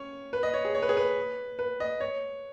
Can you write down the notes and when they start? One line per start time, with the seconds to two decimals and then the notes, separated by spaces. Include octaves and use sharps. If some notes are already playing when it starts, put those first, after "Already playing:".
Already playing: C#4 C#5
0.33 B4
0.43 D#5
0.54 C#5
0.65 G#4
0.75 C#5
0.82 B4
0.89 G#4
0.97 B4
1.59 B4
1.80 D#5
2.00 C#5